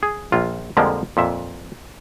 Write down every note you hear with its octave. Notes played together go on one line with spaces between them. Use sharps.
G#4
A#1 F4
F2 D3 F3 G3 G#3 A#3
F2 A#2 E5